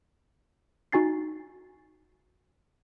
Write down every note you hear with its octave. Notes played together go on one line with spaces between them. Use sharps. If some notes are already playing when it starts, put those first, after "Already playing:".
D#4 F#4 G#5 A6 C7